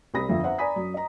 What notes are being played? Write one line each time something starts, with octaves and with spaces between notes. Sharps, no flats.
C2 G3 C4 B5 D#6 A#6
G1 F2 E5
C5 E5 F#5 A#5
D5 G#5 A#5 B5 D#6 B6
F#2
D#5 A#5